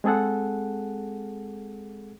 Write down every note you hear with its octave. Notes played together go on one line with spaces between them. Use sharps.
G#3 C4 G#4 A4 F#5